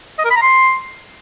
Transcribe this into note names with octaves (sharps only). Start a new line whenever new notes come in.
D#5
A#4
B5
A#5
C6